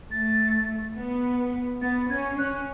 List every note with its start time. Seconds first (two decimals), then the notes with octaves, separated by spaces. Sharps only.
0.11 A3 A6
0.96 B3
1.81 B3 A6
2.10 C#4 G#6
2.38 C#4 F#6